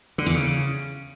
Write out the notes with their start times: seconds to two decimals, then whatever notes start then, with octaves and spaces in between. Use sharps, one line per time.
0.18 D3
0.26 E2
0.34 C#3